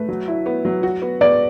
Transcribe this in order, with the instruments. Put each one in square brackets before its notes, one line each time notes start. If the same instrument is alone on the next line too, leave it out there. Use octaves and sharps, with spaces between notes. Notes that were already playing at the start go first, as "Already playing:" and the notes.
Already playing: [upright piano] A3 [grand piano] B4
[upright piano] F#3
E4
B3
F#3
F#4
B3
[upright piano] B3 [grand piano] D5